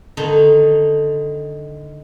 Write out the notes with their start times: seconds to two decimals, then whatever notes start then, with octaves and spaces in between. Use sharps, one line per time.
0.17 D3 D#3 D#4